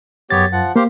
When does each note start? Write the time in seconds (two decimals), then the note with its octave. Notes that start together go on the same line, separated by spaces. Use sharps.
0.30 F#2 B3 G4 C#5 A6
0.53 F3 F#5
0.76 A#3 G4 C5 F5